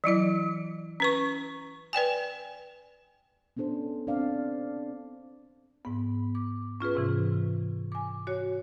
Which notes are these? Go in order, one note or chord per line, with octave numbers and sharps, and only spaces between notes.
E3 F#3 E4 D5
C#4 B4 C#6
B4 D5 G5 G#5
B3 C#4 D4 A4 C5
C4 D4 D5 F5
G#2 B3
D6
C#4 F4 G#4 B4
G#2 C3 E3
G#5 D6
F#4 C#5